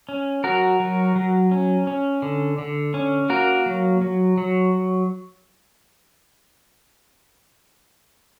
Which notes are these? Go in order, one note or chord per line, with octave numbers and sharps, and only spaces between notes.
C#4
F#3 F#4 A#4
F#3
F#3
C#4
C#4
D3
D3
C#4
A#3 F#4 A#4
F#3
F#3
F#3